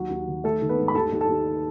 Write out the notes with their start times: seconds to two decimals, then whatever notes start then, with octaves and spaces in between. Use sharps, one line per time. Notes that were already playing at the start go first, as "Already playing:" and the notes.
Already playing: D#2 F#3 F#4
0.10 D#2
0.28 D#3
0.44 D#3 A3 A4
0.62 D#3
0.69 B3 B4
0.78 G#2
0.88 B5
0.95 D#2 A4 A5
1.12 D#2
1.21 A4 A5
1.29 D#2